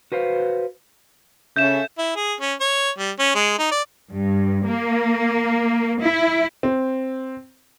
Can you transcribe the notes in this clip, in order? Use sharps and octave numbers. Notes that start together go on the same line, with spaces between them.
F#4 B4 C5 F5
C#3 C#4 A4 E5 G6 E7
E4
G#4
C#4
C#5
G3
C#4
G#3
D#4
D5
G2
A#3
E4
C4